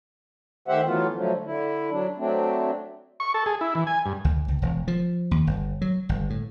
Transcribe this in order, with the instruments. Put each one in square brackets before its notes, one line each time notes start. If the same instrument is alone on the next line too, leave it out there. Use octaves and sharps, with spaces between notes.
[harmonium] D#3 A3 G4 C5 E5 F#5
E3 F#3 A3 B3 F4
D3 F3 F#3 A3
D3 E4
F#3 D4
F#3 A3 C4 D4
[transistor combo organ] C#6
A4
G#4
E4
E3
G#5
G2
[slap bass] D2
C#2
E1
F3
D#2
G1
F#3
G1
A2